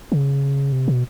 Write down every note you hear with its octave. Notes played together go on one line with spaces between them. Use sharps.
C#3
C3
B2